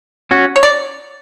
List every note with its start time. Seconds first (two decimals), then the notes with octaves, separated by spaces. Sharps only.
0.31 C#4 F#4
0.56 C#5
0.63 D5